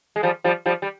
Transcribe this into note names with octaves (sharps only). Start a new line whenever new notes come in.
G#3
F3 G3
F3 G3
F3 G3
G3